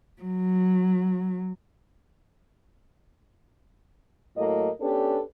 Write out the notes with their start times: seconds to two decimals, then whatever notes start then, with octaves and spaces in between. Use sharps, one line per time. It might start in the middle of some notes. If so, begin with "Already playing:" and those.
0.22 F#3
4.37 A2 F#3 A3 A#3 A4 D#5
4.81 B3 C#4 D4 G4 A4 B4